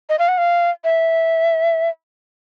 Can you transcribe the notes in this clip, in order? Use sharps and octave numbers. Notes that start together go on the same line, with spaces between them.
D#5
F5
F#5
F5
E5